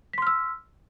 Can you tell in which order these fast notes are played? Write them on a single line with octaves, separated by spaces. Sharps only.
B6 C6 F6 E6